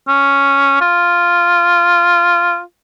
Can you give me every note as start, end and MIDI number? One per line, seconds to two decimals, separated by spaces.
0.08 0.78 61
0.81 2.61 65